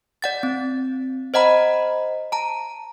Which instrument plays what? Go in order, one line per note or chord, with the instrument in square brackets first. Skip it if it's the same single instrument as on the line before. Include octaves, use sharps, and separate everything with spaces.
[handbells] D5 F#5 A6
C4
C5 D#5 F#5 A#5 B5
A5 A#5